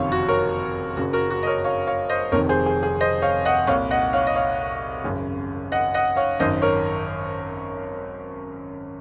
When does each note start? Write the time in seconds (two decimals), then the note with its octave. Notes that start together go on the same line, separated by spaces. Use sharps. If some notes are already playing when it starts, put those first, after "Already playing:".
Already playing: F#1 F2 C3 D#3 C#5 F5
0.12 F#4
0.28 A#4 C#5
0.97 F#1 F#2 C#3 F#4
1.13 F#4 A#4
1.30 F#4
1.43 D#5
1.47 A#4 C#5
1.64 C#5 F5
1.87 C#5 F5
2.09 C5 D#5
2.32 F1 F2 C3 D#3 A#4 C#5
2.49 G#4 C5
2.66 G#4
2.83 G#4
3.01 C5 D#5
3.22 C#5 F5
3.45 D#5 F#5
3.67 C2 A#2 C#5 F5
3.91 D#5 F#5
4.13 C#5 F5
4.27 D#5
4.36 C#5 F5
5.04 G#1 F#2 C#3
5.72 D#5 F#5
5.94 D#5 F#5
6.16 C#5 F5
6.40 G#1 F#2 D#3 C5 D#5
6.62 A#4 C#5